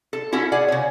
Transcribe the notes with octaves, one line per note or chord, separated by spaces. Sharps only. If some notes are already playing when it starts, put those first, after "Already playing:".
A4
C#4 E4 F#4 A4
G#4 D5 F#5
C#3 C#5